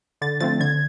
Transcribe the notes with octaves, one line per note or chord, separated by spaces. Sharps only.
D3 A6
F3 A3 C4 A6
D3 G#6